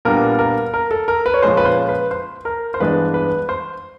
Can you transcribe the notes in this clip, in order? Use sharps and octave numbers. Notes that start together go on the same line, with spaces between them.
A#2 G3 B3 D4 A#4
A#4
A#4
A4
A#4
B4
C#5
A#2 F3 G#3 C#4 C5
B4
C5
B4
C5
A#4
C5
G2 E3 G#3 B3 D4 B4
B4
C5